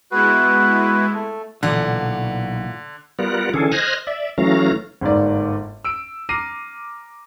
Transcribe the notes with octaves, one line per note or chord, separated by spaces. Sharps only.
G#3 B3 E4 F#4 B4
A3
B1 A#2 D3 E3 F#5
G3 B3 F4 A#4 F#5
D3 E3 C#4 G#4 A4
C5 D#5 F6 F#6 G#6 A#6
D5 E5
E3 F#3 A3 C#4 F5 A#5
G1 G#2 A#3 D5
E6 D7
A#5 D6 F6 A#6 C7 D#7